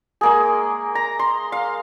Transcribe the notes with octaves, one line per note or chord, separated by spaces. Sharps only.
G#3 A#3 G#4
A#5
C6
F5